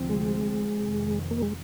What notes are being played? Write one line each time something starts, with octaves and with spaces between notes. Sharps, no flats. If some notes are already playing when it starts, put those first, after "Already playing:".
Already playing: D2 C3 F3 C4
G#3
F2 C3 D#3
A#3
G#3